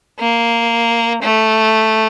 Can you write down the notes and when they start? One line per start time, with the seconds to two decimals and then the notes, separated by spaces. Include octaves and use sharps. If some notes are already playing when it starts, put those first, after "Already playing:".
0.19 A#3
1.23 A3